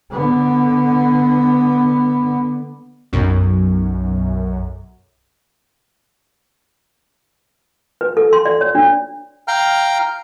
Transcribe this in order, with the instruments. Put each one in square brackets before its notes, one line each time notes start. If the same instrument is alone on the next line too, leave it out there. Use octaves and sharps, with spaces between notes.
[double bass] D3 B3
[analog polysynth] B1 F#2
[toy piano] B4
A4
C6
D5
C#5
D4
[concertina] F5 G5 A#5 F6